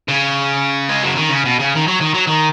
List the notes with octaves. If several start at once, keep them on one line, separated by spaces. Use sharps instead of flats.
C#3
G#3
F#3
D#3
C#3
B2
C#3
D#3
F#3
D#3
F#3
D#3